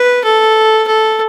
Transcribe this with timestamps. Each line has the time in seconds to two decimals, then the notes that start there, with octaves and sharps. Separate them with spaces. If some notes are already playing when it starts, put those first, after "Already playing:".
Already playing: B4
0.24 A4
0.87 A4